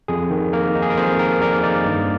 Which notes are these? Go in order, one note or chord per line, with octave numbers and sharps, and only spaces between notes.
F2 G#4
D#3
A#3 A#4
D#4
G#4
A#4
F2 G#4 C5
D#3 A#4
A#3 A#4 D5
D#4 A#4 D5
G2